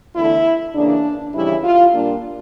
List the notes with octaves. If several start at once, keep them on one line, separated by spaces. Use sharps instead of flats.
E2 D3 A3 E4
C#3 E3 A#3 D4
F2 C#3 E3 G3 E4
F4
A#2 G3 A#3 D4